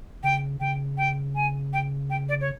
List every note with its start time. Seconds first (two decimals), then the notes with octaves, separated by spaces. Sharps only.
0.24 C#3 G5
0.60 C#3 G5
0.97 G5
1.35 G#5
1.73 G5
2.10 G5
2.29 D5
2.41 C#5